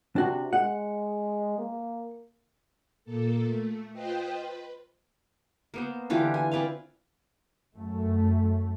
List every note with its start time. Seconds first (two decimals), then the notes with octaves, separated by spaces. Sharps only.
0.16 C3 D4 F#4
0.53 G#3 F#5
1.58 A#3
3.05 A#2 A#3 A4
3.45 A3
3.93 F4 B4 C5 D#5 G5
4.35 B4
5.74 A#3 B3 C5
6.10 D3 E3 F4 G4
6.34 G#5
6.51 C4 B4 D5 F5
7.76 F#2 A3